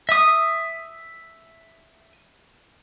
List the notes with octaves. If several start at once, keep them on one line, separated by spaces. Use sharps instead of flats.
E5 D#6